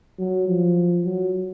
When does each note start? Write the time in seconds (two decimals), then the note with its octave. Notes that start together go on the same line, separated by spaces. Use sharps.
0.18 F#3
0.47 F3
1.04 F#3